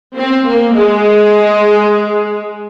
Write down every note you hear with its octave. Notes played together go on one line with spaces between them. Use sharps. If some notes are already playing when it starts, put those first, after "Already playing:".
C4
A#3
G#3